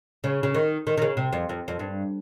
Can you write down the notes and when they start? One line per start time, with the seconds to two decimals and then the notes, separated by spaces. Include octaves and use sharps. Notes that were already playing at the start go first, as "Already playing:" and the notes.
0.24 C#3
0.43 C#3
0.54 D#3
0.87 D#3
0.98 D#3
1.02 C#3
1.17 C3
1.33 F2
1.49 F2
1.68 F2
1.79 G2